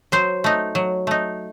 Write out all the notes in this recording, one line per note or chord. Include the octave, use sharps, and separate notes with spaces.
F#3 C5
A3 D#4
F#3
A3 D#4